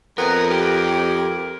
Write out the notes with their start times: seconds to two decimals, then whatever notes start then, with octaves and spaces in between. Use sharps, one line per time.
0.18 F2 B3 A#4
0.51 G4 A#4